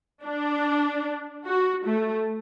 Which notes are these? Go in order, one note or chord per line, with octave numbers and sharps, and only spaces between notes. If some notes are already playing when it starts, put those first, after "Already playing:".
D4
F#4
A3